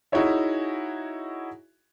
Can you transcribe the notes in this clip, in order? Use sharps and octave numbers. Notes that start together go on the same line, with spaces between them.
D#4 E4 F#4 G#4 C#5 E5